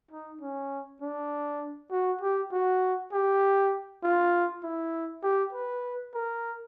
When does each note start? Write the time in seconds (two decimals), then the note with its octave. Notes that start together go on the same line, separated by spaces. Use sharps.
0.11 D#4
0.41 C#4
1.01 D4
1.91 F#4
2.21 G4
2.52 F#4
3.12 G4
4.03 F4
4.63 E4
5.23 G4
5.53 B4
6.14 A#4